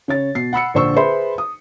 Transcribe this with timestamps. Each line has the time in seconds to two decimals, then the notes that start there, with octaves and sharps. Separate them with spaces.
0.08 C#3 C#5 A6
0.35 B2 C7
0.53 F#5 B5 E6 C#7
0.74 A#1 D3 C5 C#6 E6
0.96 G#4 B4 C5 E5 B5 C6
1.38 D#6